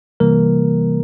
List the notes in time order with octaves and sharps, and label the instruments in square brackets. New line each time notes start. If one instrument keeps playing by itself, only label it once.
[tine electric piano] C3 E3 G3 A#3 A#4